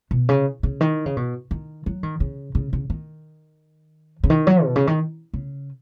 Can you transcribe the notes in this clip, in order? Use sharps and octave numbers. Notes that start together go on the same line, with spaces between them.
B2
C#3
C#3
D#3
C#3
B2
D#3
F#3
D#3
C#3
C#3
C#3
D#3
C#3
D#3
F#3
B2
C#3
D#3
C#3